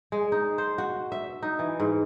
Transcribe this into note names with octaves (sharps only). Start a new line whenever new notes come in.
G#3
D#4
C5
F#4
E5
D#4
E3
G#2